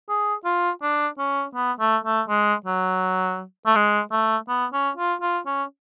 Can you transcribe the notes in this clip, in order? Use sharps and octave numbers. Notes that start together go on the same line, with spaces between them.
G#4
F4
D4
C#4
B3
A3
A3
G#3
F#3
A3
G#3
A3
B3
C#4
F4
F4
C#4